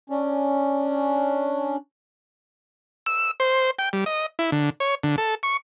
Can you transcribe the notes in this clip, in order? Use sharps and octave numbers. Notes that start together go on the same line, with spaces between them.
C#4 D4
E6
C5
G5
G3
D#5
E4
D3
C#5
D3
A4
C#6